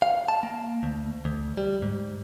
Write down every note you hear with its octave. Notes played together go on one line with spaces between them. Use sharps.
F5
A5
A#3
D2
D2
G3
G#2